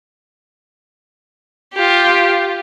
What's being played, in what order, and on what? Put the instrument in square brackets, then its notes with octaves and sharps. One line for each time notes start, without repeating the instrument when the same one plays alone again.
[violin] F4 G4